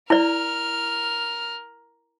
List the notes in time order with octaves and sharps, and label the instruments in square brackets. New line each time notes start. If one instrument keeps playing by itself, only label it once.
[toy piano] E4 D5 [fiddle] A#4 F6